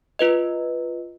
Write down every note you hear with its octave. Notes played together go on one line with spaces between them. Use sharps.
F4 B4 D#5